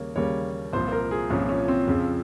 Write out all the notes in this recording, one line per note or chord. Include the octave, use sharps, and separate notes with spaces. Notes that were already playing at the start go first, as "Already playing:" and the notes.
Already playing: D#2 C#3 G3 A#3 C#5
D#2 C#3 G3 A#3 C#5
C2 A#2 F3 C5
C5
A#4
G#4
C2 A#2 F3 C#4
C#4
C4
F2 C#3 F3